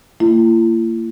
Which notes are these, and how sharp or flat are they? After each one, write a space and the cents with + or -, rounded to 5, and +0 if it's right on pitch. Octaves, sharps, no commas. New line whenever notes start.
A#3 -35 E4 +45